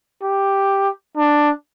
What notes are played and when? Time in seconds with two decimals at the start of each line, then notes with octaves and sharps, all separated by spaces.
0.22 G4
1.17 D4